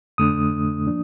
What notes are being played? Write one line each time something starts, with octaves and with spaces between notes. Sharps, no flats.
F2 D3 A3 D4 D#6
F3 A#3 D4